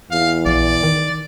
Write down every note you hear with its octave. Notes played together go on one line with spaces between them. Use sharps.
E2 F5
A#1 D5
D#3